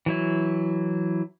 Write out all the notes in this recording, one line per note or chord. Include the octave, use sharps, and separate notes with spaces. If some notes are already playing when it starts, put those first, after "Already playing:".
E3 F#3 E4